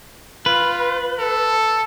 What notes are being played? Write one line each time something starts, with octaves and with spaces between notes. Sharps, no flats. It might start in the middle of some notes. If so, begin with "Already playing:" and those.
F4 B4
A4